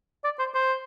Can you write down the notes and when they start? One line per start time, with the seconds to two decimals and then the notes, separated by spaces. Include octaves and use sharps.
0.24 D5
0.39 C5
0.55 C5